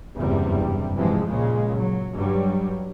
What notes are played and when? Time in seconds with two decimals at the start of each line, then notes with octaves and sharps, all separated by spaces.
0.15 F#1 E2 G2 C3 G3
0.95 G#2 C3 E3 F3 G#3
1.26 C#2 A#2 C#3 G#3
1.74 F#3
2.13 G2 F#3 G3